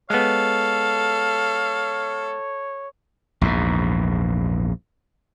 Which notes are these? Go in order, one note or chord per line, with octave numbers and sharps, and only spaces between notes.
G#3 B3 A4 C#5 F5
A#1 E2 G#2